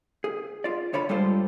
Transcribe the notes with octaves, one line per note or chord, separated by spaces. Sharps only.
G#4
F4 D5
D3 C#5 D5 B5
G2 G3 G#3 F4 A4 C5